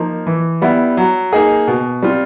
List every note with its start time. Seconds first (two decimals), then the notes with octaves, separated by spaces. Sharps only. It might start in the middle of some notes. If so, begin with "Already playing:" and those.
Already playing: F3 A#3 D#4
0.27 E3
0.62 G3 B3 E4
0.97 F#3
1.33 A#3 D#4 G#4
1.68 B2
2.02 G3 C4 F4